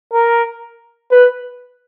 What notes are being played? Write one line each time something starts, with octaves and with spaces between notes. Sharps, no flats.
A#4
B4